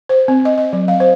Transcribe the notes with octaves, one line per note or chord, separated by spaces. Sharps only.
C5
C4
D#5
D#5
F#3
F5
C5